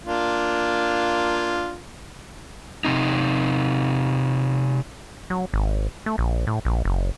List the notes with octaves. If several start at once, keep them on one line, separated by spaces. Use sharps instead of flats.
A#3 D4 F4
C3 C4 D#4
F#3
G#1
A3
A#1
A2
A#1
F#1